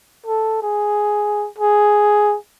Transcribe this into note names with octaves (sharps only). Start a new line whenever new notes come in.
A4
G#4
G#4